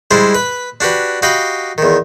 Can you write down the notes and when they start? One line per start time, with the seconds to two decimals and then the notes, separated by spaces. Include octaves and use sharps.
0.11 G3 G#3 D4 E4 C5
0.34 B4 B5
0.80 D4 F#4 G4 B4
1.22 F#4 G4 D#5 F5 G5 B5
1.78 E2 D#3